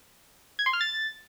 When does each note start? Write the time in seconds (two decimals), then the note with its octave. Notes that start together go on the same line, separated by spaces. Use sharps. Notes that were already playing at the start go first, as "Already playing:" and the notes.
0.59 G#6
0.66 C6
0.73 F6
0.81 A6